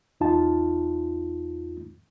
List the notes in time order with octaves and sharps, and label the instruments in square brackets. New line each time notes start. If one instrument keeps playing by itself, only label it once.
[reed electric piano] E2 D#4 F4 A5